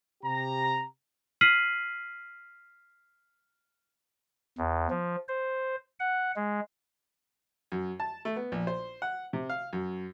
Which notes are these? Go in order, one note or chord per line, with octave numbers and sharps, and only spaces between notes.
C3 G4 A#5
F6 B6 C7 D#7 F#7
E2
F3
C5
F#5
G#3
F#2
A5
A3
B3
A#1
C5
F#5
C3
F5
F#2